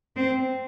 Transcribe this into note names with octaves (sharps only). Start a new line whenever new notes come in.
C4